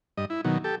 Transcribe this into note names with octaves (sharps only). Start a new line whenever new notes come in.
G2 D#5
E4
B2 D#3 F#3
G4 A4